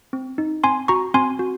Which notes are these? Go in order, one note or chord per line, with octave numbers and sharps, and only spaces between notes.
C4
D#4
C4 G#5 C6
F#4 A#5 C#6
C4 G#5 C6
F#4